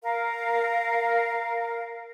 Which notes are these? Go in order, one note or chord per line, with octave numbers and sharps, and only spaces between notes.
A#4 F5